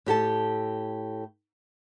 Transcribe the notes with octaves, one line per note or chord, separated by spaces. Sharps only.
A2 G4 A4 A5